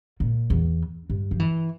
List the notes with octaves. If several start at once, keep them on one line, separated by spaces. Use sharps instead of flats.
A#2
E2
G2
F3
E3